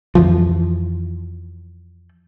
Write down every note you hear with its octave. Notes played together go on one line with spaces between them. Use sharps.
F2 E3 F3